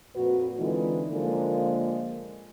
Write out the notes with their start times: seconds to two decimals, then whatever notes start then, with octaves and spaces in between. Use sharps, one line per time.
0.15 F2 A#2 F#4 B4
0.58 D3 E3 G#3 C4 D#4 F4
1.11 D3 F3 G#3 A#3